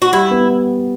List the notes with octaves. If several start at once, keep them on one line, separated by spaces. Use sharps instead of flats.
F#4
G3 E4
B3